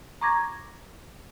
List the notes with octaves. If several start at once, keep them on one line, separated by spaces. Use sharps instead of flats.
A#5 C#6 D6 G#6 A#6